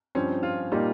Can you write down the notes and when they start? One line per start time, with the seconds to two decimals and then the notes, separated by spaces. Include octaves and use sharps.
0.15 G2 F3 C4 C#4
0.43 F4
0.72 A#2 G3 A#3 D#4 F4